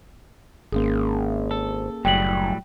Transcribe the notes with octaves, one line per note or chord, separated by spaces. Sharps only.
G#1 A#3 C#4 G#4
A4
F#1 A2 F#3 G3 G5 F#7